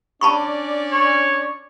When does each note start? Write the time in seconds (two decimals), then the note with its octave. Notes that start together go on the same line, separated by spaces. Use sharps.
0.21 C#4 D4 D5 A5 B5 C#6
0.92 C#5